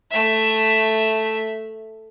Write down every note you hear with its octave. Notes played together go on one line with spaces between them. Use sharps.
A3 E5